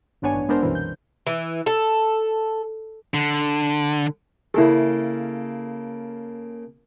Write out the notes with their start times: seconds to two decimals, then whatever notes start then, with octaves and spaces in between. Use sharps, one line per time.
0.22 G#1 G2 B3 D4 C#5 G#5
0.34 A1
0.49 G#3 B3 D4 A#4 C5
0.63 C2 F#2 B2 E3
0.75 G6
1.27 E3
1.66 A4
3.14 D3
4.54 C#3 A#3 E4 G#4 A4